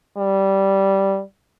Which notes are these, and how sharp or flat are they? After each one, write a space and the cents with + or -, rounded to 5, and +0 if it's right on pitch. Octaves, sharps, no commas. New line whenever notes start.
G3 -10